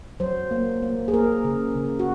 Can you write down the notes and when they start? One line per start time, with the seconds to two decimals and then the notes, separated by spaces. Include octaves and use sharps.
0.20 F#3 C5
0.51 A#3
0.83 A#3
1.08 G#4
1.13 A#3 A#4
1.45 C#3
1.76 C#3
1.99 F#4